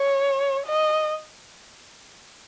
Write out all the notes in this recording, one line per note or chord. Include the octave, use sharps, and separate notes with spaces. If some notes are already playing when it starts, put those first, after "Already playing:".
Already playing: C#5
D#5